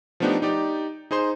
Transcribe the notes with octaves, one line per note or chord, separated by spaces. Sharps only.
F3 A3 B3 D4 D#4 G4
D#4 G4 D5
D#4 G#4 C5 C6